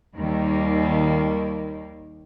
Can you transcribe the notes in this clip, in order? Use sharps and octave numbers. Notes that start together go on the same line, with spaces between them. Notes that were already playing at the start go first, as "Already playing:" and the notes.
D#2 D#3 G3 A#3